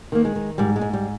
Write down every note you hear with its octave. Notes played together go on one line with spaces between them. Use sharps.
D#3 A#3
G#3
D#3
G#2 G3
G#3
G#2
G3